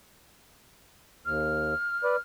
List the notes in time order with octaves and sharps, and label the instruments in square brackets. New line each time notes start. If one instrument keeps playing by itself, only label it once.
[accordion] D#2 [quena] F6
[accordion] B4 D5